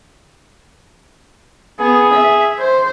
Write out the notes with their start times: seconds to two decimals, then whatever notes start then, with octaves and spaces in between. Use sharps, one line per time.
1.80 B3 G#4
2.14 E5
2.59 C5